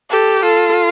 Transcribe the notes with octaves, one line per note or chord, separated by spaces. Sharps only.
G4 A4
F4 A4